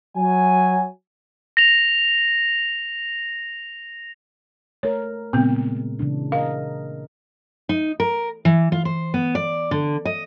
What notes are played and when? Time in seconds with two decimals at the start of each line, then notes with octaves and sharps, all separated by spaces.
0.16 F#3 G#5
1.57 A#6 F7
4.83 A3 A#4 C#5
5.33 A#2 C#3 G#3 B3 C4
5.99 C#3 E3 D4
6.32 A#4 D#5 F5
7.69 D#4
8.00 A#4
8.45 E3
8.72 F4
8.85 C5
9.14 B3
9.35 D5
9.71 D3
10.05 D#5